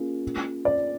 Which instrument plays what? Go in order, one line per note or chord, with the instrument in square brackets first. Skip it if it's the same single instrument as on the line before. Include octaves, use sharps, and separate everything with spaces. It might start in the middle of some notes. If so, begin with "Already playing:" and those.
Already playing: [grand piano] A#3 C#4 F4 G#4
[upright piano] D5